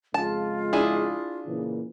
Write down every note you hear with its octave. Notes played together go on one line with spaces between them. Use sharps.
F2 C#3 G#3 F4 A5
D4 E4 G#4
A#2 C#3 E3